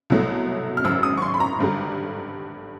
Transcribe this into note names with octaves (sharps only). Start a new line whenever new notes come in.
C2 B2 F#3 A3
F6
G#1 F#2 C#3 E6
D#6
C#6
C6
B5
A#5
G#1 G2 D3 G3